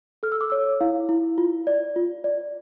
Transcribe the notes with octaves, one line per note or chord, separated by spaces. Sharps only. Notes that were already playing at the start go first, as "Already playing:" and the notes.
A4 F6
E6
D6
C#5 E6
E4 F5
E4
F4
D5
F4
D5